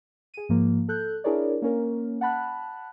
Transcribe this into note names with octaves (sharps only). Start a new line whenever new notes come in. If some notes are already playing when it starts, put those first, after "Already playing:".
G#4 D#7
G#2 F3 A#3
A4 F#6 G6
D4 E4 G#4 A#4 C#5 D5
A#3 C#4 A#4
F#5 A5 B5 F#6